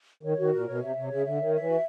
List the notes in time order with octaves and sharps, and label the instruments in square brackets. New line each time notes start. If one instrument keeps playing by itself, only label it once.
[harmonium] D#3 [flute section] C#5
[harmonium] D#3 [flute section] F#4
[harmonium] A#2 [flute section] A#4
[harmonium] B2 [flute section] C#5
[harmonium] C3 [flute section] E5
[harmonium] C3 [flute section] C#5
[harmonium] C#3 [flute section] E5
[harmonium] D3 [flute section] E5
[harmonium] D#3 [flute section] C#5
[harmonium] E3 [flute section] E5
[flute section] F#4